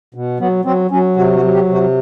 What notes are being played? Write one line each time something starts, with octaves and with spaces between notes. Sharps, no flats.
B2
F#3 B3
F#3 C4
F#3 C#4
C3 F#4
F#4
F#3
G4
C3
F#4